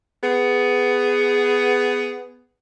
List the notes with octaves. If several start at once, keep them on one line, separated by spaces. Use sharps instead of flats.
B3 G#4